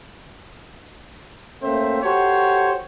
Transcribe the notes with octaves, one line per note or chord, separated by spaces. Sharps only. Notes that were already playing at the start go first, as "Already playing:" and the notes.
A3 A#3 C#4 C5 E5 G5
F#4 G4 A4 C5 C#5